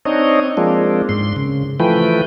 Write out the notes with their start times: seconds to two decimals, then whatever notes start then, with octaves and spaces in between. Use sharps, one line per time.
0.05 C4 D4 D#4 C#5 D#5
0.57 F3 G#3 A#3 C4 D4
1.09 G#2 C6
1.36 C#3
1.80 E3 F3 A3 B4 G5